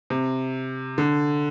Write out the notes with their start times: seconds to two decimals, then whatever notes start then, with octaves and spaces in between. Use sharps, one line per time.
0.10 C3
0.98 D3